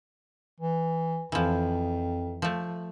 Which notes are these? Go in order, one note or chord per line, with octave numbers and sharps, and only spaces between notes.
E3
F2 E3 F3
F3 A3